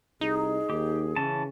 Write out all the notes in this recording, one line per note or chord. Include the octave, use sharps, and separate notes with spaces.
C2 D#4 G#4
D#2 G4
C#3 E3 C#4 A5